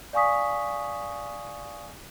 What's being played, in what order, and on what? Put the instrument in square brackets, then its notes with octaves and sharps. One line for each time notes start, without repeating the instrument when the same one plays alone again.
[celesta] D5 F5 G#5 C#6 D#6 B6